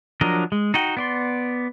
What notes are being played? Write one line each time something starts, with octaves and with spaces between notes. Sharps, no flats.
F3 F#3 D4 A#4 D#5
G#3
D#4 F#4 G5
B3 D5 C6